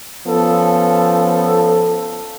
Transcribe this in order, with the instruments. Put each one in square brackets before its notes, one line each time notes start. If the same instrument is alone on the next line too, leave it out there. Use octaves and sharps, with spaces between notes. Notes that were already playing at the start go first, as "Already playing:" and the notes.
[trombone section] F3 B3 C#4 A4